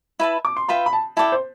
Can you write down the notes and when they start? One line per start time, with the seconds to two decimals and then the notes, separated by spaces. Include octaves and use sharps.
0.20 E4 B4 E5 A5
0.45 D6
0.57 C6
0.68 F4 B4 E5 G5 B5
0.86 B5
0.93 A5
1.17 E4 A4 D5 G5 A5
1.32 C5